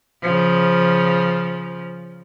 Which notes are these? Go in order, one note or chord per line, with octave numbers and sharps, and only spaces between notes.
C#3 F3